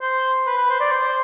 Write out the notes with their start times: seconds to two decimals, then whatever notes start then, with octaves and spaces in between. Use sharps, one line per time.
0.02 C5
0.47 B4
0.57 B4
0.70 C5
0.81 D5
0.91 C5